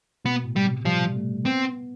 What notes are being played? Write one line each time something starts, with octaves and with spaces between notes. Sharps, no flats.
B2 B3
A2
G3
C3
F3 G3
A3
B3 C4